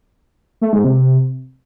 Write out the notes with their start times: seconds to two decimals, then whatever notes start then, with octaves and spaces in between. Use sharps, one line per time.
0.61 A3
0.73 G#2
0.84 C3